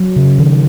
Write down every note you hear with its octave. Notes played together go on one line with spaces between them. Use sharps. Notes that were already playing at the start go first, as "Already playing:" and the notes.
Already playing: F#3
C#3
D#3